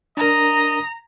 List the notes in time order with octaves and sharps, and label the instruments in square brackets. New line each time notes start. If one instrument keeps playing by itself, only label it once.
[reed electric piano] D4 A#4 [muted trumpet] D#5 [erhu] A#5